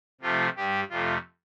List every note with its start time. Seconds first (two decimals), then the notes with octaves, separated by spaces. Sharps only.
0.21 C3 F3 A3 F4
0.56 G2 G3 G4
0.90 F2 C3 A3 F4